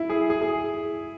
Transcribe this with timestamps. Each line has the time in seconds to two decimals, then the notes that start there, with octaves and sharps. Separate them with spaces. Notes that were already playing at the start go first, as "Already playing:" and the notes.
Already playing: E4
0.10 G#4
0.30 G#4
0.42 G#4